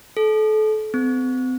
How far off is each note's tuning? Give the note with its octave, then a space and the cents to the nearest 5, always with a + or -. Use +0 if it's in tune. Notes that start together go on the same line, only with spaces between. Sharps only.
A4 -30
C4 -40